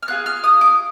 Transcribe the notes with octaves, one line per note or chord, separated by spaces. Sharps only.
F6
C4 F4 G#4 F#6
F6
D#6
D6